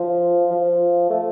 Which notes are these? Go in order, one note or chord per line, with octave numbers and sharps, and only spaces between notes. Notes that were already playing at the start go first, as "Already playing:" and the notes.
Already playing: F3
F3
A3